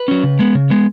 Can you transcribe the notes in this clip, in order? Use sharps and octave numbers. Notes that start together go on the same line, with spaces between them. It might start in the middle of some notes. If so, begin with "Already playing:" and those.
Already playing: B4
F#3 C#4
C#3
G#3 B3
C#3
G#3 B3